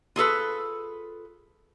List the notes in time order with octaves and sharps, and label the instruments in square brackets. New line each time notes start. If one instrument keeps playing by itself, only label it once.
[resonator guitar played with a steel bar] F4 G#4 A4 B4